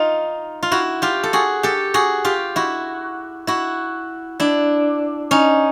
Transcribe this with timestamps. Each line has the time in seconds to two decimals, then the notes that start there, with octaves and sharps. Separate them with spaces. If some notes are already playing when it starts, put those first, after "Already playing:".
Already playing: D#4 F4
0.63 F4
0.71 E4 F#4
1.02 F4 G4
1.23 A4
1.33 F#4 G#4
1.63 G4 A4
1.94 F#4 G#4
2.25 F4 G4
2.56 E4 F#4
3.47 E4 F#4
4.40 D4 E4
5.31 C#4 D#4